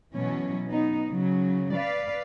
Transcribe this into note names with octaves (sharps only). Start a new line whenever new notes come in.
B2 E3 F#3 C#4
B3 D#4
C#3 F#3
B4 D5 F5